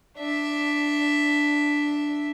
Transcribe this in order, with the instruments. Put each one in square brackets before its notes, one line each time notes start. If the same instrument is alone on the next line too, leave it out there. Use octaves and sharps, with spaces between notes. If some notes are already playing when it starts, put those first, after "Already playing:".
[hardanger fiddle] D4 E5